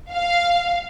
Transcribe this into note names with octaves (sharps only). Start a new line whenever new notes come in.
F5